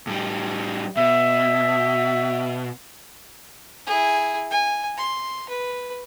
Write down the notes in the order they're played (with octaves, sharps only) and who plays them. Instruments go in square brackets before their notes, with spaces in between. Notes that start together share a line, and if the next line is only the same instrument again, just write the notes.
[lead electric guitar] A2 G3
[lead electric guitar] B2 [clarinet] E5
[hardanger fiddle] E4 G#4
G#5
C6
B4